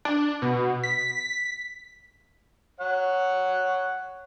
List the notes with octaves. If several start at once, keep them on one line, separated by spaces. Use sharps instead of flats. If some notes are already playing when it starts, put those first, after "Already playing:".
D4
B2
B6
C#5 F#5